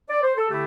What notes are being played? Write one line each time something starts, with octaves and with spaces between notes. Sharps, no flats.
D5
C5
A4
D3 A3 E4 G4